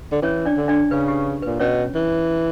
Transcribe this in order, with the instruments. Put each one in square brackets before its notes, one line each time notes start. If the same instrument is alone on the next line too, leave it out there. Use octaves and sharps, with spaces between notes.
[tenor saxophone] D3
[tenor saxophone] E3 [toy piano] C#4 C#5
[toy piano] D4 D5
[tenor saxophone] D3
[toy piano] D4 D5
[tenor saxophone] C#3 [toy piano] B4
[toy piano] G4
B4
[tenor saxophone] A#2
[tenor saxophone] B2 [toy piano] C#4 C#5
[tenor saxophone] E3